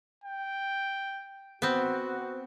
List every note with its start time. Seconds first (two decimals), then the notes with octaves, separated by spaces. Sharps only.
0.24 G5
1.62 B3 C4 F#4